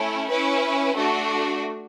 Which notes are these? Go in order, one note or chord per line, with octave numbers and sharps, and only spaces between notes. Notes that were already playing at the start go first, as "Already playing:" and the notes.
Already playing: A3 C#4 E4
C#4 E4 B4
A3 D4 F#4